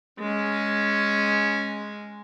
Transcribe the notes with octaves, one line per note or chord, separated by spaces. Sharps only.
G#3 C#4